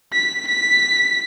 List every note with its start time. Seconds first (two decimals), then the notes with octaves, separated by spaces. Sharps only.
0.13 B6
0.48 B6